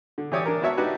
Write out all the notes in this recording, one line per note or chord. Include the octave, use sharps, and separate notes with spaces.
D3
E3 E4 G4 C#5 D5 D#6
D4 A#4
B3 E4 F#4 C#5 E5 A5
D4 D#4 F#4 G4 B4